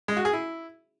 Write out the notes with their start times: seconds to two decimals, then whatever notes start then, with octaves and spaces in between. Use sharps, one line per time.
0.08 G#3
0.17 F#4
0.25 G#4
0.33 E4